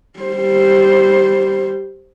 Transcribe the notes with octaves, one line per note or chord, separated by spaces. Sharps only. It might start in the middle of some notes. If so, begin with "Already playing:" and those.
G3 C5